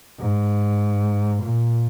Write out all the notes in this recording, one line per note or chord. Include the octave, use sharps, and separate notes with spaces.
G#2
A#2